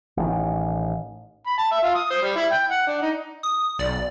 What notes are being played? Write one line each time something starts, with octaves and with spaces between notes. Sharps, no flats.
A1 A2 C3 D#3
B5
A5
E5
F4
D#6
C5
G3
E4
G5
F#5
D4
D#4
D#6
B1 D5